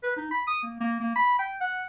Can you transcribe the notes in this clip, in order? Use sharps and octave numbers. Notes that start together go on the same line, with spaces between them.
B4
D#4
B5
D#6
A#3
A#3
A#3
B5
G5
F#5